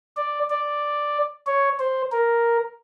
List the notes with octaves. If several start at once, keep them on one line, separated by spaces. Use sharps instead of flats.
D5
D5
C#5
C5
A#4